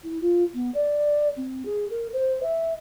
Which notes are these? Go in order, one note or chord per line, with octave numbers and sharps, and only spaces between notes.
E4
F4
B3
D5
C4
G#4
A#4
C5
E5